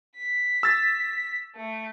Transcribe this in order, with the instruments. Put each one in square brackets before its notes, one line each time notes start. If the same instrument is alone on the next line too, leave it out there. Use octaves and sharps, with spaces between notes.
[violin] B6
[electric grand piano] E6 A6
[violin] A3